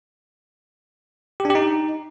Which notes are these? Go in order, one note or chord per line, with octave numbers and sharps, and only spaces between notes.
G4
D4
G4
D#4